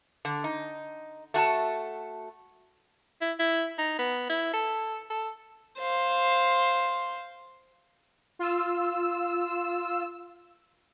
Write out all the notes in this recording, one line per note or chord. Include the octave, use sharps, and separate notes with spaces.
D3
D#4
A3 F#4 G#5 A5
E4
E4
D#4
B3
E4
A4
A4
C5 F5
F4 E6